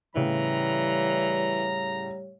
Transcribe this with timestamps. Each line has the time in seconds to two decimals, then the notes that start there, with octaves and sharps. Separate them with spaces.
0.15 A2 C#3 E3 G3 C#5 A#5